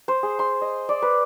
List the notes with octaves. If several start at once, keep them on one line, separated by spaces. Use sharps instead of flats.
C5
G#4
C6
D#5
D5
B4